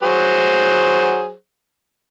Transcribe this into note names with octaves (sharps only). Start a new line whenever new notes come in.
F#3 G#4 C5